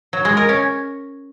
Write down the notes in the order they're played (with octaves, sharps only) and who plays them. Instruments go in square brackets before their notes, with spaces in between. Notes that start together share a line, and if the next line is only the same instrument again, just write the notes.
[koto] F#3
G#3
A#4
C#4